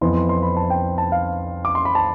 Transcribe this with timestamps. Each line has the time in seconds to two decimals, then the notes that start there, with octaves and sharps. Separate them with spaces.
0.01 F2 E3 B3 C6
0.15 C6
0.29 C6
0.43 B5
0.57 A5
0.70 G5
0.98 A5
1.12 F5
1.65 D6
1.75 C6
1.85 B5
1.95 A5